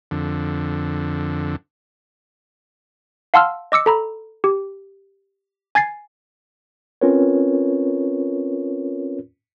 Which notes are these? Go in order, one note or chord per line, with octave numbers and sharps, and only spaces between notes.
F2 D3
F5 F#5 A5 C6 E6 F6
D#5 D6 E6 C#7
A4 A#5 B5
G4
G#5 G#6 A6 C7
C4 C#4 F4 A#4 B4 C#5